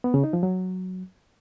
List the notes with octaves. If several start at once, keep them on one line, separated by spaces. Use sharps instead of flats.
B3
C#3
D#4
F3
F#3